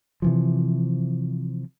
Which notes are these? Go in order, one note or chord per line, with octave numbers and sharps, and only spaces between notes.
C3 E3 F3